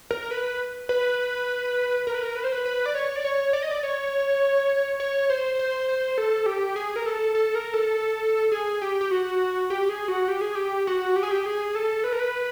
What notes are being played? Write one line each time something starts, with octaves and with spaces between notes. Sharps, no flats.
A#4
A#4
B4
B4
A#4
B4
A#4
B4
C5
B4
B4
D5
C#5
D5
C#5
D5
D#5
D5
C#5
C#5
C5
C5
C5
A4
G4
G#4
A#4
A4
A4
A#4
A4
G#4
G4
G4
F#4
G4
G#4
F#4
G4
G#4
G4
F#4
G4
G#4
G4
G#4
A4
B4
A#4
B4